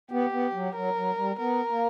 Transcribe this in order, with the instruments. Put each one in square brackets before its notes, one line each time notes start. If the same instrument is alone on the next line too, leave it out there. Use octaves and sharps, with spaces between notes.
[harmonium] B3 [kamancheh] G4
[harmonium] B3
F#3
[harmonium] F#3 [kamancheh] A#4
[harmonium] F#3
G3
[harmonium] B3 [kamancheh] A#4
[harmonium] A#3